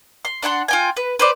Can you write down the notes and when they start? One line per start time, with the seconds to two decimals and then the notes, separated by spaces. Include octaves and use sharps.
0.25 C6
0.43 D4 F#5 G#5 C6
0.68 F4 G5 G#5
0.97 B4
1.19 B4 C5 D5